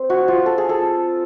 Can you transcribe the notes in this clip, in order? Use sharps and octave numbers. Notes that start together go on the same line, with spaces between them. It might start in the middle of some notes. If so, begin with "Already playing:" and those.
Already playing: C4
F#4
F4
A4
G#4
A4